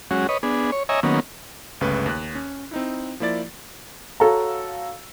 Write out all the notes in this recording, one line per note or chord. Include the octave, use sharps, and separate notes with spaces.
F#3 G#3 C#4 F#4
B4 C#5 D#5
B3 D4 G#4
C#5
C#5 D#5 E5 G#5 A#5
D#3 F#3 A#3 B3 C#4
G1 C#2 C#3 A3 B4 C#6
D#2 F#6
C#4
C4 D#4 E4
F3 A#3 E4 D5 A6
F#4 A4 C#5 F5 A#5